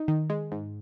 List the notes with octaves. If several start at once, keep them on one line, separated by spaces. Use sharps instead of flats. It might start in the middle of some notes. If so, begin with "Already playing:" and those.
Already playing: D#4
D#3
G#3
G#2